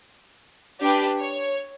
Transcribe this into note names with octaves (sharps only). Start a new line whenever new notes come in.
D4 G4 B4
C#5